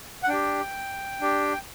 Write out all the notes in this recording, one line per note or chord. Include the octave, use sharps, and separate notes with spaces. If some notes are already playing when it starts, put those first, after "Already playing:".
F#5
D4 G4 G5
D4 G4